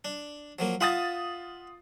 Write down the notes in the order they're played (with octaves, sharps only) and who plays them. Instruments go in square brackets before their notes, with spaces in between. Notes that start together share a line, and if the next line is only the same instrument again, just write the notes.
[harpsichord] D4
F3 F#3 A#3
[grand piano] F4 D#6 A6 [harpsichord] E5 F#5